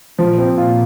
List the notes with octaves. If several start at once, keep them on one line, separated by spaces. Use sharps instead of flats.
A#2 F3
C4
F4